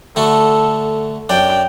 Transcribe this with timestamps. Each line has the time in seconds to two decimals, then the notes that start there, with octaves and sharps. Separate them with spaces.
0.16 D3 A3 F#4 A4
1.29 F#2 D4 D5 G5